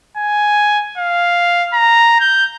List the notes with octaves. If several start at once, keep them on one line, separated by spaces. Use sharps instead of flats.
G#5
F5
A#5
G6